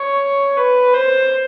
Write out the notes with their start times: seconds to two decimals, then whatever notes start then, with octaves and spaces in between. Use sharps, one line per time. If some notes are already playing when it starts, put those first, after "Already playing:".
Already playing: C#5
0.57 B4
0.94 C5